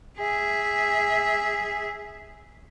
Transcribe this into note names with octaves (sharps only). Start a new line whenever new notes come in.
G#4 E5